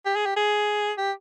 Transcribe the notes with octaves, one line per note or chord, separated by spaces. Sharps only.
G4
G#4
G4
G#4
G4